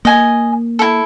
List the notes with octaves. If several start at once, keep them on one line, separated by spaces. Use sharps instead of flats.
A#3 D#5 G#5
E4 A4